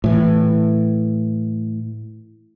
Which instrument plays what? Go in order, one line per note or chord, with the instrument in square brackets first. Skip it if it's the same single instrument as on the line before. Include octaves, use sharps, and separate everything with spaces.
[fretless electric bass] A2 E3